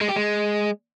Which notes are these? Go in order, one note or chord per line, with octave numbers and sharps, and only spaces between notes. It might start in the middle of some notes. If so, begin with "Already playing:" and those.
G#3
G4
G#3